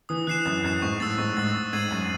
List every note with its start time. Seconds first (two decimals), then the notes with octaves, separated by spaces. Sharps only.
0.09 E3 D#6
0.27 E3 F#6 C7 E7
0.45 F#2 D#6
0.64 F#2 F#6 C7 E7
0.82 G#2 C#6
1.00 A2 E6 A6
1.18 G#2 C#6
1.37 G#2 E6 A6
1.54 C#6
1.73 G#2 G#6 C7 D#7 F#7
1.91 F#2 C#6